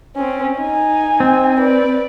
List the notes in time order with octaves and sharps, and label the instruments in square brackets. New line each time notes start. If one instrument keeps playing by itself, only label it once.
[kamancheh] C4 C#4
D#4 G#5
[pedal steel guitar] C4
[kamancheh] B4 D5